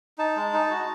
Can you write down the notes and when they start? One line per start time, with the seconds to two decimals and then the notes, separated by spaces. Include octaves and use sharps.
0.18 D#4 A5
0.36 G#3
0.53 D#4
0.70 F#4